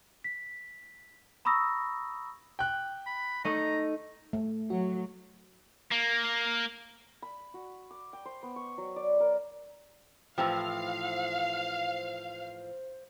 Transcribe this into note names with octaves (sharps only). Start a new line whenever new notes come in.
B6
A#5 B5 C#6 D#6 E6 A#6
G5 F#6
B5
A3 D#4 D#5 A#5
A3
F#3 F#4
A#3
B5
F#4
D6
G5
C5
B3
C#6
F#3
D5
A#4
A2 E3 F3 G4 C5 F5